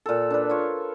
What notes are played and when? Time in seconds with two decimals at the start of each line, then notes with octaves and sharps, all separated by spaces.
0.06 A#2 A4
0.30 D4 B4
0.49 F4 C#5